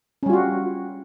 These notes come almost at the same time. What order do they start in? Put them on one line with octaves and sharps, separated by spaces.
C#4 G3 F4 F#4